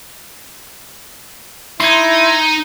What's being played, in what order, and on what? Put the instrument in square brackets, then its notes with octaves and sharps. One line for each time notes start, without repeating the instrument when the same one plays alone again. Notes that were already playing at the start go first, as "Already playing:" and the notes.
[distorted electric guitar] D#4 [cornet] E4 [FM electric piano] C6 G#6